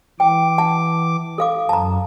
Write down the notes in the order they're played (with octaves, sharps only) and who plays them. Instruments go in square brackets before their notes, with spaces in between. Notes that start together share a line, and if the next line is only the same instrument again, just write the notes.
[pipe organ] E3 D6 [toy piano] G5
[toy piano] F#5 A5
A4 F5 D6
[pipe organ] F#2 [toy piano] A5 A#5